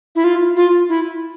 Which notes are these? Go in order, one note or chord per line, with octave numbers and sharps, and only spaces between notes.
E4
F4
F4
E4